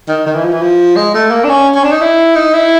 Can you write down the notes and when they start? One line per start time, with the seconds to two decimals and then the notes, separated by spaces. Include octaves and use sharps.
0.08 D#3
0.26 D#3
0.35 E3
0.44 F3
0.52 E3
0.62 F3
0.96 G#3
1.14 A3
1.31 A#3
1.44 D4
1.49 C#4
1.75 C#4
1.84 D4
1.92 D#4
2.01 E4
2.36 D#4
2.54 E4